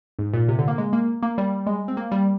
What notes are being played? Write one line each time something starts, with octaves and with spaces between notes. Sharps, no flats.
G#2
A#2
C3
D3
A#3
G#3
A#3
A#3
G3
G#3
C4
A#3
G3